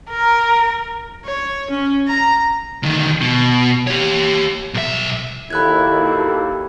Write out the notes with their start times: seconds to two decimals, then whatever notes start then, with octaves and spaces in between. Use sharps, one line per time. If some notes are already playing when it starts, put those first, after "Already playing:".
0.10 A#4
1.25 C#5
1.70 C#4
2.08 A#5
2.83 D2 D#3
3.21 B2
3.87 G4 C#5
4.74 B1 E5
5.50 D#2 E4 F#4 A4 B5 F#6 G#6